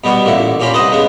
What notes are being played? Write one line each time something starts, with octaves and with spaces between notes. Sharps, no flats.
B2 G3 B3 C#6
A1 A#2 D3 E4
A#2 C#4 G4 C5 B5
C2 B4 C5 D#5 F#5 A5
C#3 G#3 B3